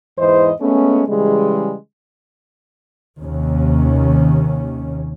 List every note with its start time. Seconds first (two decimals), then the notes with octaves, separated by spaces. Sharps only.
0.18 E2 G#2 E3 C5 D#5
0.61 G#3 A3 B3 C#4
1.08 C#3 E3 G3 G#3
3.22 D#2 C3 D#3 C#4